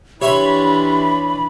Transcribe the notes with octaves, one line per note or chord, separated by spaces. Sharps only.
E3 D4 G4 C#5 E5 B5 C6